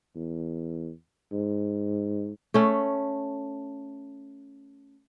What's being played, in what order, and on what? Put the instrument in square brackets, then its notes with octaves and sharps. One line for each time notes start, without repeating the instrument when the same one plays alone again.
[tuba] E2
G#2
[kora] A3 C#4